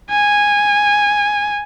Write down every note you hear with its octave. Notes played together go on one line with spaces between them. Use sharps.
G#5